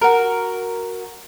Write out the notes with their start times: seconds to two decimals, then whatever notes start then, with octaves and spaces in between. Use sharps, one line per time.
0.02 F#4 A#4